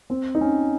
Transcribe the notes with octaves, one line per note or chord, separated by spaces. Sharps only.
C4
D#4
C#4